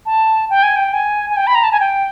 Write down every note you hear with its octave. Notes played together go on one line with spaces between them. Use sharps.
A5
G5
G#5
G5
G#5
G#5
G5
B5
A#5
A5
G#5
G5